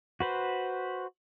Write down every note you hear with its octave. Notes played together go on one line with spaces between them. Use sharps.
F#4 B4 C5